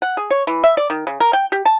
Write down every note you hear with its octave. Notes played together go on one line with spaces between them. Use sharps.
F#5
G#4
C#5
E3
E5
D5
D#3
C#3
A#4
G5
G4
A5